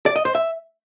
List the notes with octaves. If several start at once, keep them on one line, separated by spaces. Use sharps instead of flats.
D5
D#5
C5
E5